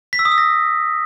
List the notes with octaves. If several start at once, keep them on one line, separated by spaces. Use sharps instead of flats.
B6
E6
D#6
E6
A#6